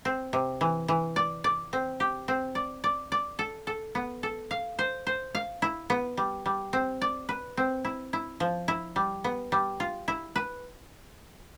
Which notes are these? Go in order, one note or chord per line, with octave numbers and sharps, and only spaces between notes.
C4
C3
E3
E3
D5
D5
C4
G4
C4
D5
D5
D5
A4
A4
B3
A4
F5
C5
C5
F5
E4
B3
G3
G3
C4
D5
B4
C4
E4
E4
F3
E4
G3
B3
G3
F4
E4
B4